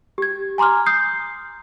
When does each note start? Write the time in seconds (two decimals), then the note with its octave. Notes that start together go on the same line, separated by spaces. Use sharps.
0.18 G4 G#6
0.58 G#5 A#5 C6 D6 F6
0.86 D#6 G6 C7